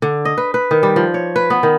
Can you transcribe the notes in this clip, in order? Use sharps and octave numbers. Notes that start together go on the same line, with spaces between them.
D3
D#5
B4
B4
D#3
G3
F3
C#5
B4
B3
D#3